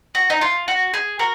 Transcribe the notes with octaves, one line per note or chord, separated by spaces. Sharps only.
F#4
D#4
F4
F#4
G#4
F#4 A#4